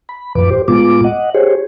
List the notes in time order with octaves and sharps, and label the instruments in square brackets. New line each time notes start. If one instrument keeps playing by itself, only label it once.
[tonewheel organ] B5
F#2 A2 F3 B4 D6
G4 C5
A2 G#3 B3 F4 D6
D#5 F#5
G4 G#4 C5 C#5